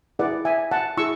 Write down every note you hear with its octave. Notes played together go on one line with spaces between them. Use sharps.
E4 G#4 B4 D5 F#5
E5 G#5
F#5 A5
E4 G#4 C#6 E6